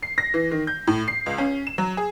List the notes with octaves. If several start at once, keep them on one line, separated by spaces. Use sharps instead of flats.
C7
A#6
E3
D#3
G6
A2
C7
C#2
C#4
E7
F#3
G#4